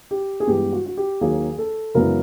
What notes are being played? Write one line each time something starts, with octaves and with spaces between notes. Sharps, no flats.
G4
G#4
G2 E3 G#3 B3 G4
F#4
F#4
G4
D#2 D#3 F#3 A#3 G#4
A4
F#2 C#3 E3 G#3 B3 A#4